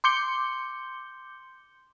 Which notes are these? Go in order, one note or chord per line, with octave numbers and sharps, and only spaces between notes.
C6 D6 G6 C#7 G7